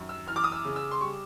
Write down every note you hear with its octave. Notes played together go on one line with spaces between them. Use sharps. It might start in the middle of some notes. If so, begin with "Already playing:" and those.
Already playing: F#2 D#3
E6
E3 F6
D6
D#6
E6
C#3
E6
C6
G3 C#6